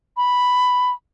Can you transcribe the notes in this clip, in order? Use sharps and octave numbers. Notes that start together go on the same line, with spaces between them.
B5